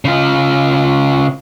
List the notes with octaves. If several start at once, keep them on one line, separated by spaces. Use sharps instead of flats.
C#3 F4